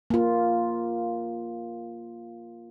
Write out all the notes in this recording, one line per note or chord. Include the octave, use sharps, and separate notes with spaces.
A#3 F4